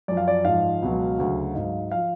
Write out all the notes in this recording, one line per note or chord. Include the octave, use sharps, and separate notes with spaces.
F#2 F3 D5
F5
D5
G#2 F3 F5
C#2 B2 F#3
D2 C#3 F#3
G#2 F#3
F3 F5